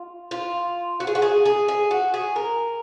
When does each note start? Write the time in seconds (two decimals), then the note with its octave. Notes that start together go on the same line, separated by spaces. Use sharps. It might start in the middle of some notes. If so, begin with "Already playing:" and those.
Already playing: F4
0.31 F4
1.00 F#4
1.07 G#4
1.15 F#4
1.22 G#4
1.45 G#4
1.68 G#4
1.91 F#4
2.14 G#4
2.36 A#4